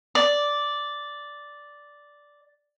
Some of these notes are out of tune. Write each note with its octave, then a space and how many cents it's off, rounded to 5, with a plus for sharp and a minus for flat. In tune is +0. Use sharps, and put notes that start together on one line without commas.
D5 -5